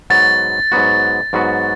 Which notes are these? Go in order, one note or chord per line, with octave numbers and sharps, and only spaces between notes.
G#2 F#3 B3 F#4 A6
G#2 F#3 B3 F#4
G#2 F#3 B3 F#4